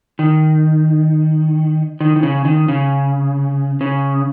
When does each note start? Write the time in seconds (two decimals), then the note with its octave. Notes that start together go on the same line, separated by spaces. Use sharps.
0.19 D#3
2.00 D#3
2.16 D#3
2.23 C#3
2.45 D#3
2.68 C#3
3.81 C#3